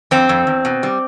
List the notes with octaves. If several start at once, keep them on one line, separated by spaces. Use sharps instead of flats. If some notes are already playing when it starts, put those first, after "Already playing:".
F2 C4
F2
E2
B2
G3